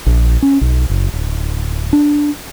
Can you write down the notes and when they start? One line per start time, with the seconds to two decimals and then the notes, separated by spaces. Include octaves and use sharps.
0.06 A#1
0.42 C#4
0.61 B1
0.90 F#1
1.14 D1
1.93 D4